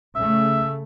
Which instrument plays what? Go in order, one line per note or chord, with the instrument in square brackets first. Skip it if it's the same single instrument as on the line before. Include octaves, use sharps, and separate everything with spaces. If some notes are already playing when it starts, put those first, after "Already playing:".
[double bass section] C#3 A3 [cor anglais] E5